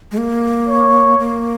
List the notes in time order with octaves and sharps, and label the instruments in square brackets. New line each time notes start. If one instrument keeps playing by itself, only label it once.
[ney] G#3
A#3
[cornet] C#5
[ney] A#3